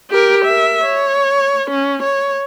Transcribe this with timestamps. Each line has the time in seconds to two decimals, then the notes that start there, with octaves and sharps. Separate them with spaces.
0.11 G4 A#4
0.45 A#4 E5
0.84 C#5
1.70 C#4
2.03 C#5